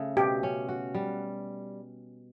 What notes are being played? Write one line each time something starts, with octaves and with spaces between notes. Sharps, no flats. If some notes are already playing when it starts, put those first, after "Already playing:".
Already playing: C#3 A3
B2 G4
C#4
F#4
G3